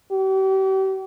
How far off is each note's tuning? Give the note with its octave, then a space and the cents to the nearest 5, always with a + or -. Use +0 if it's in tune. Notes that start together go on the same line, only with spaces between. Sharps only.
G4 -40